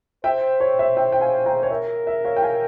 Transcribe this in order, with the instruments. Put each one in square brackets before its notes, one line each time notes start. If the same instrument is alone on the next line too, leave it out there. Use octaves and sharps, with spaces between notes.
[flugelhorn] C5 [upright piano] E5 G5
[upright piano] C#5
E5
E5 G5
G5
F5 G#5
G5 A#5
C#5
[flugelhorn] A#4 [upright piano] E5
[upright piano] E5
C#5 F5
G5
F5 G#5